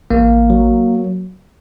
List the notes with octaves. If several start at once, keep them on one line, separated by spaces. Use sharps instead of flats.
A1 A#3
F#3